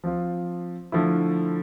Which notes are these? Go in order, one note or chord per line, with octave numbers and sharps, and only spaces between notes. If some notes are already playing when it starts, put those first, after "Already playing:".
F3 C4 F4
D3 F3 A3 E4